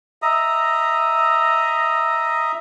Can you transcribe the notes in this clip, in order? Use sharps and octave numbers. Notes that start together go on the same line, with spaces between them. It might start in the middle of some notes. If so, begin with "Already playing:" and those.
D#5 E5 A#5 D#6